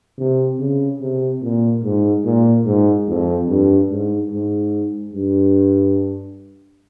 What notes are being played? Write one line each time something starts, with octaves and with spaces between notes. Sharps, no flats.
C3
C#3
C3
A#2
G#2
A#2
G#2
F2
G2
G#2
G#2
G2